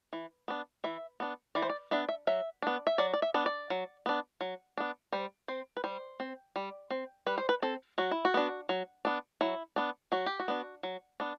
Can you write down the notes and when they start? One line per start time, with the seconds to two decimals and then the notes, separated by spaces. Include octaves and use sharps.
0.13 E3
0.48 B3 D4
0.84 E3 E5
1.20 B3 D4
1.55 E3 D5
1.62 C5
1.69 D5
1.91 B3 D4 E5
2.09 E5
2.27 F#3 E5
2.62 B3 D4
2.87 E5
2.98 F#3 D5
3.13 D5
3.22 E5
3.34 B3 D4
3.46 D5
3.70 F#3
4.06 B3 D4
4.41 F#3
4.77 B3 D4
5.12 G3 C5
5.48 C4 C5
5.77 B4
5.84 G3 C5
6.20 C4
6.56 G3
6.90 C4
7.26 G3 B4
7.38 C5
7.49 B4
7.62 C4 A4
7.98 F#3 F#4
8.11 E4
8.25 F#4
8.34 B3 D4
8.69 F#3
9.05 B3 D4
9.41 F#3 E4
9.76 B3 D4
10.12 F#3 F#4
10.26 G4
10.40 F#4
10.48 B3 D4
10.83 F#3
11.20 B3 D4